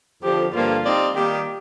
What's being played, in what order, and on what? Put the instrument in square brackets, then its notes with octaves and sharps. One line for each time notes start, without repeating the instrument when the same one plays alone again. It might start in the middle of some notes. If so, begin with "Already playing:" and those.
[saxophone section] F2 D3 F3 [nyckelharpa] G4
[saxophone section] G2 D3 F3 A#3 [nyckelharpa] F4
[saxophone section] G3 C4 D#4 G4 D5
[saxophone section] D#3 G3 A#3 [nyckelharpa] G4